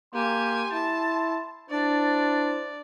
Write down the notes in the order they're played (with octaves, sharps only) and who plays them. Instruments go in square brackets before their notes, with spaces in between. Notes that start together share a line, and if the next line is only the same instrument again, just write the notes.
[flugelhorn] A#3 [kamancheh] G4 G#5 [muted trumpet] C6
[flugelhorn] E4 [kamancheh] A5
[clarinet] D4 [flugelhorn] E4 [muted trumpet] C5 [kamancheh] D5